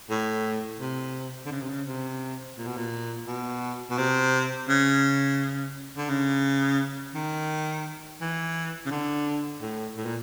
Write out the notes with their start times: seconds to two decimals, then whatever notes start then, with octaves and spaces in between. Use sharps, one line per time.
0.10 A2
0.80 C3
1.46 D3
1.52 C#3
1.62 C3
1.69 C#3
1.87 C3
2.57 A#2
2.66 B2
2.77 A#2
3.27 B2
3.90 B2
3.98 C3
4.69 C#3
5.97 D3
6.09 C#3
7.15 D#3
8.21 E3
8.86 C#3
8.91 D3
9.62 A2
9.97 A2
10.06 A#2